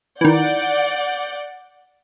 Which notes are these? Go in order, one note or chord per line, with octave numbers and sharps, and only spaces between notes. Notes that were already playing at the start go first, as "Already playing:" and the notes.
D#3 E3 D5 F#5 G6